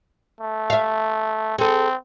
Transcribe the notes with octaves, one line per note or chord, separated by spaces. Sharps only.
A3
E5 F5
C4 G#4 A4